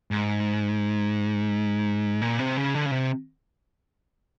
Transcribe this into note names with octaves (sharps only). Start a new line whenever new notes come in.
G#2
A#2
C3
C#3
D3
C#3
C3